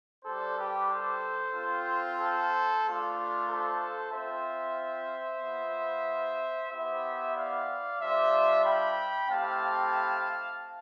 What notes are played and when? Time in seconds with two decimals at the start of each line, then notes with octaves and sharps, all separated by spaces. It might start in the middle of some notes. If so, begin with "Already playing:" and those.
0.24 G3 D4 G4 A4 C5
0.57 G4 B4
0.89 A4 C5
1.54 C4 F4
2.18 A4 C5
2.83 A3 D4 F4
3.48 A4 C5
4.12 C4 F4 C5 E5
5.41 B3 F4
6.70 B3 E4 G4 C5 E5
7.35 D5 F5
8.00 G3 D4 F4 C5 E5
8.64 G5 B5
9.29 A3 C4 E4 G4 F5 A5